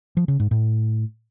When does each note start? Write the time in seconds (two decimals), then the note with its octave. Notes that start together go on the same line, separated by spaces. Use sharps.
0.17 F3
0.28 C#3
0.40 G#2
0.51 A2